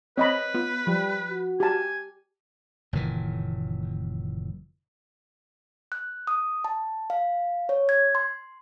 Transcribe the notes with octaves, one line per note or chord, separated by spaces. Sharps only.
C4 B4 C#5 D#5 B5
B3 F4
F3 G3
F#4
G4 G#5 A5
F#1 A#2 D#3 E3
F#6
D#6
A5
F5
C#5
G#6
C6